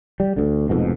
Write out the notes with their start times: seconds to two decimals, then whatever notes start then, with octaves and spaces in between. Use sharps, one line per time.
0.20 G3
0.36 D2 D3
0.69 F1 F2 G#2 B2